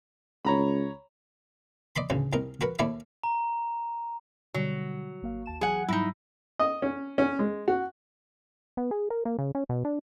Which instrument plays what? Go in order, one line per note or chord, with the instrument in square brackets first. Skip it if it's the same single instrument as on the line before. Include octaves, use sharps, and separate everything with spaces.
[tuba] C#2 [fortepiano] C#5 A#5 B5
[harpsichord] D5 D#5 B5 C6
A1 D2 C#3
C2 D#4 A#4
F#4 A#4 B4 F#5
D#2 A3 E4 D5 E5
[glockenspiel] A#5
[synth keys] B2 D3 G3 [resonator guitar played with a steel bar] F#3
[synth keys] G#1 A#3 F5
D#2 A5 E7
[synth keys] E3 F#3 [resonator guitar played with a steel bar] G#4 F#5
[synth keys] G#2 F#3 G3 [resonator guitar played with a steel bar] D#4 E4
[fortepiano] D#5
C#4
C#4
G#3
F#4
[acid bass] B3
G#4
A#4
A#3
C#3
C#4
B2
D4